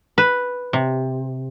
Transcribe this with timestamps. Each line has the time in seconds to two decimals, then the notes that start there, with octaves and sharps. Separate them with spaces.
0.18 B4
0.73 C3